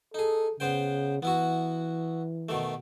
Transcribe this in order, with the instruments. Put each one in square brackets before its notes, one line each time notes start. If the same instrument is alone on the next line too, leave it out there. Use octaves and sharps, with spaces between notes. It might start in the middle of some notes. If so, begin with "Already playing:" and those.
[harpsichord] D#4 G#4 [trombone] A4
[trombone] C#3 [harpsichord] B3 C5 G5
[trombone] E3 [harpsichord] B3 E4 F#4
[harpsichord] B2 D#3 A3